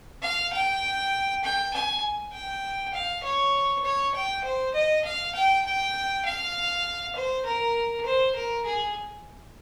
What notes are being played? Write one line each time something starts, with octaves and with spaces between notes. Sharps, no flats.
F5
G5
G5
G#5
G5
F5
C#5
C#5
G5
C5
D#5
F5
G5
G5
F5
C5
A#4
C5
A#4
G#4